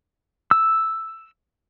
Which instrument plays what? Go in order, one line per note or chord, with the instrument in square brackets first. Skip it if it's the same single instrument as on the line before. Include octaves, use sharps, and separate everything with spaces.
[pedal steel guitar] E6